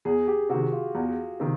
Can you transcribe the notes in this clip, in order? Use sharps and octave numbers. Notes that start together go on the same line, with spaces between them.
E2 G#4
G4
C3 D#3 F#4
F4
E2
C3 D#3